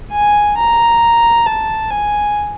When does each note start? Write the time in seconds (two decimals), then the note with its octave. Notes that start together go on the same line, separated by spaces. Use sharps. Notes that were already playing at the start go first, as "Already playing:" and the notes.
0.12 G#5
0.57 A#5
1.46 A5
1.91 G#5